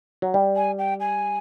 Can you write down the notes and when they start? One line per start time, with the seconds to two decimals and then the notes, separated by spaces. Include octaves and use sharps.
0.22 F#3
0.34 G3
0.56 G#5
0.78 G5
1.00 G#5